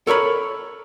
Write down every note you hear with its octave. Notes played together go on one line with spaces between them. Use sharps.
A4 A#4 C#5 B5